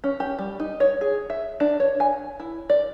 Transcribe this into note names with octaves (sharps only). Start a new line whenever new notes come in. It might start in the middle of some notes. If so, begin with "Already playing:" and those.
C#4
G4
G3
D#4
C#5
G#4
E5
D4
C#5
G#5
E4
D5